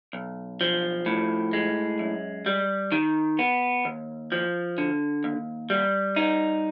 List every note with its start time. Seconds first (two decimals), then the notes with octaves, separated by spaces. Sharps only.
0.13 B1
0.61 F3
1.06 A2
1.53 G#3
1.99 F#2
2.46 G3
2.92 D#3
3.39 B3
3.85 D#2
4.32 F3
4.78 D3
5.24 D#2
5.70 G3
6.16 D#4